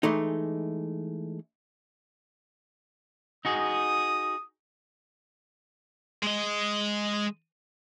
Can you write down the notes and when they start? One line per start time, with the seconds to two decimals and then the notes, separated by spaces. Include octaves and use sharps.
0.03 E3 G#3 A3 D#4
3.45 D#4 F#4 G#4 D#6
6.23 G#3 D#5